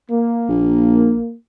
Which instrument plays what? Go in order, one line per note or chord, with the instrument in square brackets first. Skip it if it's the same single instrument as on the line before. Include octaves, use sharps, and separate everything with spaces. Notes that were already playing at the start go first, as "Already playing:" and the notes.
[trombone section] A#3
[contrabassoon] A#1